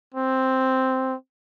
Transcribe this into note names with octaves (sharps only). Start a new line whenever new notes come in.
C4